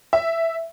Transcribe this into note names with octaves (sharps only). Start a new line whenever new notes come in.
E5